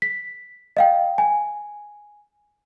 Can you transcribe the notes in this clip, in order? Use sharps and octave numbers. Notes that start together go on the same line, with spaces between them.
B6
D#5 F5 G5
G#5